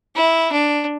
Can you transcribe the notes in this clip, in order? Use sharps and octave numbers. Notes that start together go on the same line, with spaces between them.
E4
D4